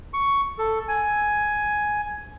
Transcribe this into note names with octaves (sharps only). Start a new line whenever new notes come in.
C#6
A4
G#5